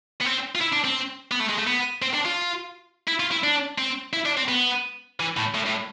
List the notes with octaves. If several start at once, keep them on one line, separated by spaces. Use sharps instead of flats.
B3
C4
F4
E4
D4
C4
B3
A3
G#3
A3
B3
C4
D4
F4
E4
F4
E4
D4
C4
E4
D4
C4
B3
E3
A2
A2
A2